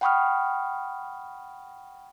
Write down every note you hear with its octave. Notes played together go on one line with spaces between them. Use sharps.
F#5 G5 B5 C#6 D#6 F6